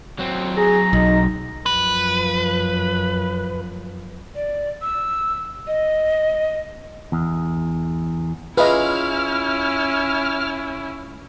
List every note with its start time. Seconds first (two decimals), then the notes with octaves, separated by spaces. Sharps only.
0.19 F#3 C4
0.57 G#4 A#5
0.93 B1 D#4
1.66 F#2 F3 B4
4.36 D5
4.82 E6
5.67 D#5
7.12 E2
8.57 C#4 E4 F4 G#4 B4 D#5 E5 F6